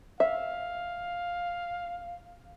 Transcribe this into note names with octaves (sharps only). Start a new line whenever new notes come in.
E5 F5